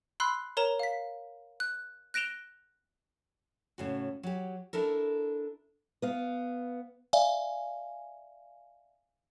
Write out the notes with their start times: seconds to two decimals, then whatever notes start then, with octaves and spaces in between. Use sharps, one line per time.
0.20 B5 C6 E6 F#6 C7
0.57 A#4 C#5 A#5 E7
0.79 F5 B6
1.60 F#6
2.14 F#6 A#6 D7 E7 F7 G7
3.78 A2 C#3 F#4
4.23 F#3 G4
4.73 D4 E4 A4 A#4
6.02 B3 F5
7.13 D5 E5 F5 G#5